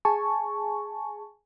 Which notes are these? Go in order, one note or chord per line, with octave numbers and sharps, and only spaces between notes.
G#4 G#5 A5 C#6